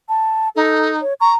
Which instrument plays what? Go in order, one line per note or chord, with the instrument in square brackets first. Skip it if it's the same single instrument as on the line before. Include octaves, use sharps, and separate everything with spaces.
[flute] A5
[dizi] D#4 [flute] A4
[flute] C#5
[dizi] A#5 [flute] C#6